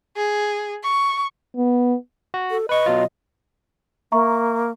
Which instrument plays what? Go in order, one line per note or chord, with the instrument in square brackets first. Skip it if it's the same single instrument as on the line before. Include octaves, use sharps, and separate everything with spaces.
[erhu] G#4
C#6
[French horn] B3
[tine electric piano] F#4
[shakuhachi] A4
[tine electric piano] B4 C#6 [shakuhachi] D#5
[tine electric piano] B2 F#3 F4
[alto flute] A#3 [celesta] E5 A#5 C#6